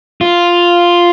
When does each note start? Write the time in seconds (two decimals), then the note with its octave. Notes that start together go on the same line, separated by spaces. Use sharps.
0.21 F4